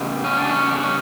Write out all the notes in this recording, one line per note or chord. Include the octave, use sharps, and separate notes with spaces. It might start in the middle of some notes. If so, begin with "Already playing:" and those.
Already playing: E2 C#3
C#4
D4
C#4
D4
C#4